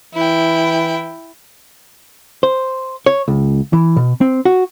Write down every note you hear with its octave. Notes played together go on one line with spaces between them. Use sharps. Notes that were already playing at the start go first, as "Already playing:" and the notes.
E3 E4 G5
C5
C#5
C#2
E3
B2
C4
F#4